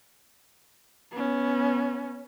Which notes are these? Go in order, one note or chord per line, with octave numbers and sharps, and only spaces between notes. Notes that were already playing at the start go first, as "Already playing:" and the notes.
B3 C#4